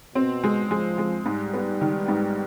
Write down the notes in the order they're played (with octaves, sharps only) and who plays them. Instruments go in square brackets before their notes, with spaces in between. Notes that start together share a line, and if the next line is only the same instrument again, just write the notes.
[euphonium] B2 [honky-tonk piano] C4
[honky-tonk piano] G#3
[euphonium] F3 [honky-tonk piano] G#3
[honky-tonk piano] G#3
[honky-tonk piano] G#2 [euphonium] G3
[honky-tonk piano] B3
D#3
G#2